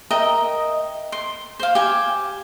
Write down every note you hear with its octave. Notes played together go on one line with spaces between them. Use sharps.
A#4 D#5 E5 G5
C6
C5 F5
G4 G#5